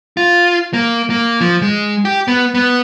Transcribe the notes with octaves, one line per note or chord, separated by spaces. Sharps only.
F4
A#3
A#3
F3
G#3
G4
B3
B3